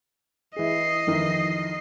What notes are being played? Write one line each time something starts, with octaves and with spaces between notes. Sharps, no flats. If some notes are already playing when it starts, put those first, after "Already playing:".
E3 G#4 D#5 C7
F2 D#3 E3